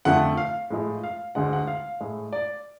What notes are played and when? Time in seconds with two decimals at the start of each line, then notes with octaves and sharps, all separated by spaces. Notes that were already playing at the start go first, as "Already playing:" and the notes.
0.05 F2 D3 F3 A3 F#5
0.37 F5
0.70 A2 F3 G#3
1.04 F5
1.35 D2 D3 G#3 F#5
1.53 F#5
1.67 F5
2.01 A2 G#3
2.33 D5